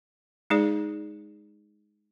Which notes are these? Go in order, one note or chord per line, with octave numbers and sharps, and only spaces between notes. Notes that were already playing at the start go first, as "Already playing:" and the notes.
G#3 D#4 G#4 D5